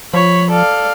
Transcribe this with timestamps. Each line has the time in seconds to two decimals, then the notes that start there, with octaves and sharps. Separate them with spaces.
0.14 F3 C#5 B5
0.51 A4 D5 F5